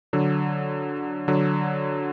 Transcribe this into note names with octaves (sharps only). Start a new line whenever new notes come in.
D3 F#3
D3 F#3